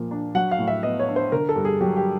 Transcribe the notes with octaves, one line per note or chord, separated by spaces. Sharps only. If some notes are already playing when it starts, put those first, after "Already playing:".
Already playing: A#2 F3 A#3
D4
F#3 F#5
F5
A2
E5
B3 D#5
C#5
D4
C5
D3 A#4
A4
G2
G#4
F#3 G4
G4